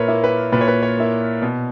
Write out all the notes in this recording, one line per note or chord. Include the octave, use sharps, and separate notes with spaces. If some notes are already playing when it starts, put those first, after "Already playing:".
Already playing: A#2 A#4 B4 C#5 E5
A#3 E4
B4
A#2 B4
C#5
B4
C#5
A#3 E4
B2